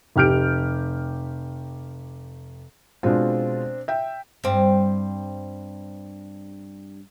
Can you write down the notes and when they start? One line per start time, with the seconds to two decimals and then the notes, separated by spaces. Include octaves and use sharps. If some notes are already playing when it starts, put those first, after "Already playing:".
0.16 F1 G4 F6 G6 D7
3.03 B2 G#3 C4 D4 F4
3.88 E5 G5
4.44 G2 C4